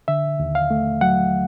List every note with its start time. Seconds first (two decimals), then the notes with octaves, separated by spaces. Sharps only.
0.08 D3 E5
0.40 D#2
0.55 F5
0.71 A3
1.01 F#3 F#5